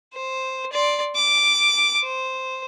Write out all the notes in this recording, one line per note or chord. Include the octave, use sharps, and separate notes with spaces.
C5
D5 C6
D6
C5